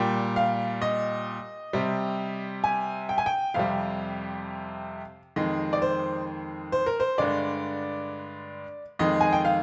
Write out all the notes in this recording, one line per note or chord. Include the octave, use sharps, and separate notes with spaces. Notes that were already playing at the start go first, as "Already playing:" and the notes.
Already playing: A#2 G3 G5
F5
D#5
C3 G3
G#5
G5
G#5
G5
F2 C3 G3 F5
F2 D#3 G#3 D#5
D5
C5
C5
A#4
C5
G2 D3 G#3 D5
F2 D#3 G#3 D#5
G#5
G5
F5